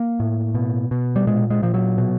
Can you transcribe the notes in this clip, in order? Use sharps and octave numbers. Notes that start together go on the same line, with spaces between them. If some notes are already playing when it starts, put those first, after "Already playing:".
Already playing: A#3
A2
B2
B2
G3
A#2 G#3
G#3
A#2 F3
F#3
B2